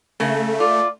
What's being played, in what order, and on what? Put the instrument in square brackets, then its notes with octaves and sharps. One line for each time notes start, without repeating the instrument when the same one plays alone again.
[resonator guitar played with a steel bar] C#3 A#3 [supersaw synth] A3
[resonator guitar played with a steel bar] F4 [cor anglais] D5